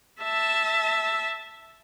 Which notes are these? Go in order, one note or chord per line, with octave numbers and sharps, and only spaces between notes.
E5 A5